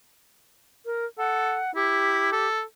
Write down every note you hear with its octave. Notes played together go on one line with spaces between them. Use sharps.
A#4
A4 F#5
E4 G4
A4